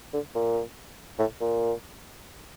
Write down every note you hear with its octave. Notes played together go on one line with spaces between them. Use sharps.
D3
A#2
A2
A#2